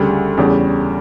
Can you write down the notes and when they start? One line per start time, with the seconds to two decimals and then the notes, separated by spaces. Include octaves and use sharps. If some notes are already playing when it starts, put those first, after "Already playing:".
Already playing: D2 C#3 G3
0.37 E2 C#3 G3 C#4